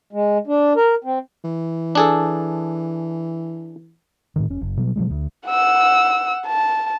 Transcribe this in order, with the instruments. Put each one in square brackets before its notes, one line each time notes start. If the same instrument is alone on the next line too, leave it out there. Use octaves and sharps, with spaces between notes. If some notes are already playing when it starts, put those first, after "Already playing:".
[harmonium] G#3
D4
A#4
C4
[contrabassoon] E3
[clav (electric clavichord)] D4 G#4 A4
[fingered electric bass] A2 C3 D#3
F1 C#4
F#1
B2 F#3 G3
B2 F3 F#3 G#3
D2
[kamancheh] F#5 E6
A5